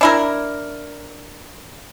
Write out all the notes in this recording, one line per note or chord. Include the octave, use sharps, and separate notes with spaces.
D4 E4 A#4